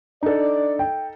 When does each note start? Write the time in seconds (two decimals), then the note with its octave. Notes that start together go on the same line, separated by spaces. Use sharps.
0.23 D4 D#4 A4 D5
0.79 G5